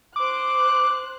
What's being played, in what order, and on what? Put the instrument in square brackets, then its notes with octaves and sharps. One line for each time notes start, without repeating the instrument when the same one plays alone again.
[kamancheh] C5 F#6 [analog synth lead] D6